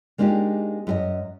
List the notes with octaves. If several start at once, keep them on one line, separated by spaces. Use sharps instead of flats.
G#3 A#3 D4 D#4 F4 G4
F#2 G#4 D#5